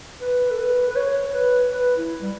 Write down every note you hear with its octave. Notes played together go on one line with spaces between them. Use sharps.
B4
A4
B4
B4
C#5
B4
B4
E4
G3